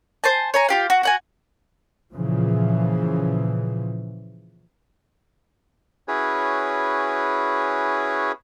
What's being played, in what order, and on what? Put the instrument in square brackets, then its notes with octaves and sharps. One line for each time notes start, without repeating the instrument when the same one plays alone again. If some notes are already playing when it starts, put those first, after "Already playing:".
[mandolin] C5 G#5 A5
C#5 G#5 A#5
F4 G4 F5
F#4
F#4 F#5 G#5
[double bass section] A#2 C#3 E3 F3
[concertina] C#4 E4 F#4 G#4 B4 C#5